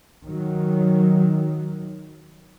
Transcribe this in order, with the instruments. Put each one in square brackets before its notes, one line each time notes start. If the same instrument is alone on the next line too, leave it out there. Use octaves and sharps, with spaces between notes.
[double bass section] D#3 F#3